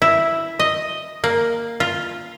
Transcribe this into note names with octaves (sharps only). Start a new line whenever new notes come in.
E4
D#5
A#3
F4